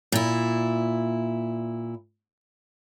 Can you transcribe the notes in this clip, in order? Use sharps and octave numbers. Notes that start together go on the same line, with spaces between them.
A#2 E4